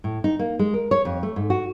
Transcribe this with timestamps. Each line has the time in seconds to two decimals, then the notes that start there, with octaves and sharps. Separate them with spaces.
0.04 A2
0.24 D#4
0.39 A#3
0.59 G#3
0.74 A#4
0.91 C#5
1.05 F2
1.23 A3
1.36 G#2
1.50 F#4